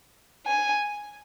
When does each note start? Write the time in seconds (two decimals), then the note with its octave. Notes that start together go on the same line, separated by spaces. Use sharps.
0.47 G#5